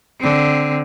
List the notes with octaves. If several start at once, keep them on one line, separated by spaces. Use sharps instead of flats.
D3 C4